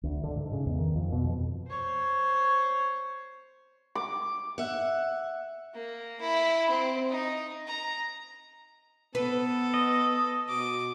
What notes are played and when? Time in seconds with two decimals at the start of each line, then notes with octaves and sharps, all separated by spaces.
0.03 D2
0.23 D3
0.36 G#2
0.52 C#3
0.66 E2
0.79 D#3
0.95 F2
1.12 B2
1.24 F2
1.68 C5 C#5
3.95 D6
4.58 E5 F#5
5.74 A#3
6.21 E4
6.69 C4
7.09 D#4
7.67 A#5
9.15 B3 A4 B4
9.74 D#5
10.49 B2 D6